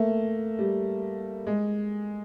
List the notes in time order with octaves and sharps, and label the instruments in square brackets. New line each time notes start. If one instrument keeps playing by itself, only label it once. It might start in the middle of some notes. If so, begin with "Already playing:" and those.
Already playing: [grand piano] A3 A#3
G3
G#3